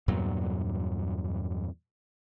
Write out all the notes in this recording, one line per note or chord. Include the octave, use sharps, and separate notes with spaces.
E2 G2 A#2 F#3